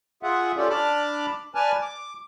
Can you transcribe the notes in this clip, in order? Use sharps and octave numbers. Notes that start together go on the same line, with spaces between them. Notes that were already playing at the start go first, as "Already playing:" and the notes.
F4 G#4 E5 F#5
C#4 F4 G4 A4 D5
D4 A5 B5 D6 F6
B4 D5 G#5 A5 F6
D6